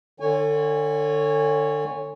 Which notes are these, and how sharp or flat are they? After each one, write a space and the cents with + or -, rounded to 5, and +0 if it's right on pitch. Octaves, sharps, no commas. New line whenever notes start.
D3 +30 C#5 +0 G#5 -25